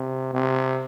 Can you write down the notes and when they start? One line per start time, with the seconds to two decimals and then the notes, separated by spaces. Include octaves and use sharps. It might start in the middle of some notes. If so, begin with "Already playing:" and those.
Already playing: C3
0.34 C3